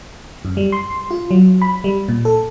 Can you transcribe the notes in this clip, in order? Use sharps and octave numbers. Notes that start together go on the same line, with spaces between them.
F#2
G3
C6
F4
F#3
B5
G3
A#2
A4